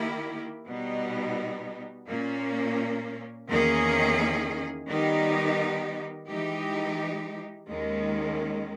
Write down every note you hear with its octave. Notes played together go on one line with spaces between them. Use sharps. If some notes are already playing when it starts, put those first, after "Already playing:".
Already playing: D#3 A#3 E4 G4
B2 G3 B3 D#4
A#2 A#3 C#4
E2 D#3 A#3 C#4 G#4
D#3 G3 B3 D#4 G4
E3 G#3 D#4 G4
D#2 D#3 G#3 C#4